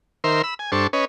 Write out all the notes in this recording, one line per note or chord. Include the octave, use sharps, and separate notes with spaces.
D#3 A#4 C5 E5 C6
B5 E6
G#5
G2 D4 A4 C5 C#6
C#4 B4 C#5 D#5